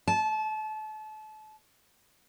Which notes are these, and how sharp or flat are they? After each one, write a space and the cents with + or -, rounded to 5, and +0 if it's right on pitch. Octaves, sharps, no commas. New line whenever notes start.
A5 -30